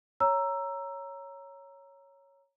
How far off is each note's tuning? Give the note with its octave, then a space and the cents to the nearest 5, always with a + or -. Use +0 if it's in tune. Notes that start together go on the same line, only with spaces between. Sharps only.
C#5 +0 A#5 +0 E6 +10